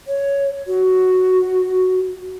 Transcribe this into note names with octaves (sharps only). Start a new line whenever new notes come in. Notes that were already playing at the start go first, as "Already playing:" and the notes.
C#5
F#4